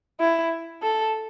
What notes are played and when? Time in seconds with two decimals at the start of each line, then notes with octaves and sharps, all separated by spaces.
0.20 E4
0.83 A4